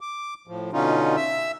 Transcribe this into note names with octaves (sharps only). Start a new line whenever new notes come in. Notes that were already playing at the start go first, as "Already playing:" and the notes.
D6
A2 F3
B2 D3 C#4 D#4 F4
E5 E6